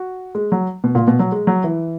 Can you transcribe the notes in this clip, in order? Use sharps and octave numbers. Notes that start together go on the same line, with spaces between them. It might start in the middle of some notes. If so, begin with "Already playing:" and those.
Already playing: F#4
G#3
F#3
B2
A#2
B2
F#3
G#3
F#3
E3